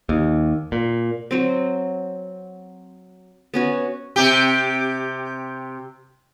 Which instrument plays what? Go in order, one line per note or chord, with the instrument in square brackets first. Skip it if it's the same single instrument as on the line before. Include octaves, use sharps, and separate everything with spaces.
[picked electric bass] D#2
A#2
[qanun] F#3 C4
B3 C#4 F#4
[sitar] C3 G4